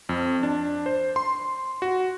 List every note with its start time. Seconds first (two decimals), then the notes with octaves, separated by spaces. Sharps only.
0.09 F2
0.43 D4
0.86 C5
1.16 C6
1.82 F#4